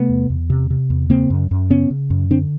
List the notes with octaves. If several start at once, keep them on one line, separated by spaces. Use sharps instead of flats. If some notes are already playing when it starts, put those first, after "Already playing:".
Already playing: C3 A3 B3
E2
E2
C3
C3
E2
C#3 A#3 C4
F#2
F#2
C#3 B3 C#4
C#3
F#2
D3 C4 D4